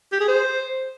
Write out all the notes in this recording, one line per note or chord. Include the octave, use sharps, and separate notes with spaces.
G4
G#4
C5